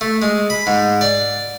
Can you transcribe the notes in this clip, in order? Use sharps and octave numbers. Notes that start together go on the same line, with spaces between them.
A3
G#3
B5
G#2
D5